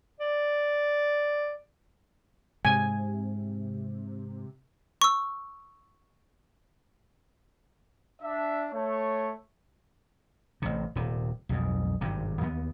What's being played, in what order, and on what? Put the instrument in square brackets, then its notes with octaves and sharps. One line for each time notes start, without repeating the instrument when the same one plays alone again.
[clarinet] D5
[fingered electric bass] G#2 [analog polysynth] C3 [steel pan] G#5
[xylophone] C#6 E6
[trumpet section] D4 E5
A3 C#5
[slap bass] A1 C3
D#1 C3
B1 F2 G#2
G#1 G2 C3
D#2 B3